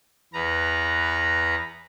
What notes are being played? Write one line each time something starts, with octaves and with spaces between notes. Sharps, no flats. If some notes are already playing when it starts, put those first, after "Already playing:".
E2 B4 A#5